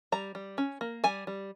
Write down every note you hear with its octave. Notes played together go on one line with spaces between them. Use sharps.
G3 A#5
G3
C#4
A#3
G3 G#5
G3